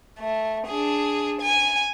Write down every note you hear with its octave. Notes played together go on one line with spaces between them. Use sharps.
A3
D4 G#4
G#5